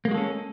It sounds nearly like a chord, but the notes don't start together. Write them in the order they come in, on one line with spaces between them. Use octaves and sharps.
A#3 G#3 F#4 A4 C#4